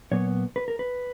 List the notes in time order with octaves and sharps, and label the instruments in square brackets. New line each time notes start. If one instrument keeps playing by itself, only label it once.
[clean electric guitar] A#2 F#3 B3 C#5
B4
A#4
B4